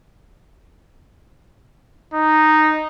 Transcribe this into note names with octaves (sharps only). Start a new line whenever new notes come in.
D#4